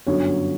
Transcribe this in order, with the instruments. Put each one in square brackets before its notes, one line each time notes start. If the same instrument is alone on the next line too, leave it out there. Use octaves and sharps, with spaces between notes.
[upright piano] G1 F#2 D3 F#3 C#5